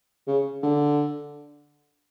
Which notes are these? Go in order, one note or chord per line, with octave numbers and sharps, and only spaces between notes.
C#3
D3